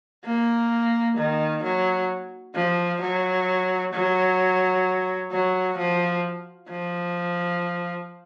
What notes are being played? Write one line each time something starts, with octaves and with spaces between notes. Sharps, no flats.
A#3
D#3
F#3
F3
F#3
F#3
F#3
F3
F3